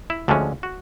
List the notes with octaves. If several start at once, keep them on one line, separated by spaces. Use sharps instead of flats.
E4
D2 D3 F3 G#3 C#4
F#4